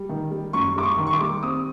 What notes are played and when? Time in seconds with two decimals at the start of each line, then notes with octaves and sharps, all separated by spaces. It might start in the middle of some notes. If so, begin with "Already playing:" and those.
Already playing: G3
0.09 D#3
0.31 G3
0.53 F#2 C#6
0.76 G3 D6
0.83 C#6
0.98 D#3
1.07 C#6
1.13 D6
1.21 G3
1.43 C4 D#6